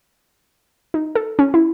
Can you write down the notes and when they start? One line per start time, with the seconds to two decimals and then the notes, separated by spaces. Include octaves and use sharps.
0.94 D#4
1.15 A4
1.39 C#4
1.54 E4